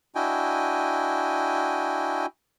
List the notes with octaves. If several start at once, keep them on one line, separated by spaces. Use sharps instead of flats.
D4 E4 F#4 D#5 G5 G#5